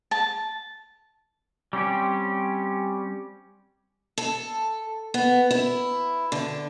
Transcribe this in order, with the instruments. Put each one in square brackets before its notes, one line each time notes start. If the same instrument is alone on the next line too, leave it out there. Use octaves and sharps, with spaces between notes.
[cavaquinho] A5
[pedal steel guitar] G3 C4 C#4 G4
[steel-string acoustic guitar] A4
B3
E4
D3